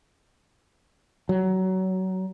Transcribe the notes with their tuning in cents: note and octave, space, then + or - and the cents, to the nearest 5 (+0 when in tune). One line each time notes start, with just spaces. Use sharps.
F#3 +20